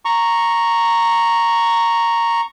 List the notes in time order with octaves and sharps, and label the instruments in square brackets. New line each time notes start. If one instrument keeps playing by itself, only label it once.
[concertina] A#5 C#6